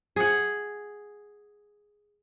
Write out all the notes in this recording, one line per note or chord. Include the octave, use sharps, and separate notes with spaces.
G#4 F#5